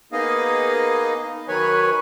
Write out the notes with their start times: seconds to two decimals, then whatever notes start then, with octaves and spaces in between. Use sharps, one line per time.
0.13 A#3 B3 D#4 G#4 D#5 F5
1.48 D#3 F#3 B4 C#5 G#5